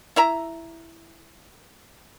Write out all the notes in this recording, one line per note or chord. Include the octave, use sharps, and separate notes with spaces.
E4 E5 A#5